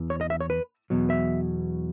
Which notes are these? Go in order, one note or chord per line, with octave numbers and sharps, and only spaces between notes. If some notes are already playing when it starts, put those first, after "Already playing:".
Already playing: E2 E3
C#5
D#5
E5
C#5
B4
E2 B2 F#3
E5